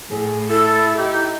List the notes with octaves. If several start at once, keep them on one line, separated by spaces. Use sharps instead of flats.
A2 G#4
E4 A4
D#4 G4